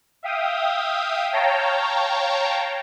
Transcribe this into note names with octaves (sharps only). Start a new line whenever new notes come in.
E5 F5 G5 D#6
C#5 F5 G5 A5 A#5